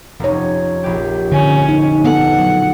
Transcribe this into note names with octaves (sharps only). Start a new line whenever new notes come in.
F1 F3 D#4 C#5
A#1 G4
D3 C#4
D#4
B3 A4 F#5
F#3